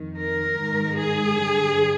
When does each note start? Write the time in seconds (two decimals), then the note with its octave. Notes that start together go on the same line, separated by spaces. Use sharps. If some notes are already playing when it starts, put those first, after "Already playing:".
Already playing: F2 D#3
0.17 A#4
0.58 G#2 D#3
0.99 G#4
1.39 G2 D3